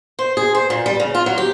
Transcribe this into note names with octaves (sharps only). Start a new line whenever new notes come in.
C5
G#4
C5
A#2
G3
C#3
F4
F#3
G4